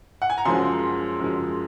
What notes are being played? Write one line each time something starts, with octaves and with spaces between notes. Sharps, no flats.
F#5
G#5
A#5
F#2 F3 G#3 C6
F#2 F3 G#3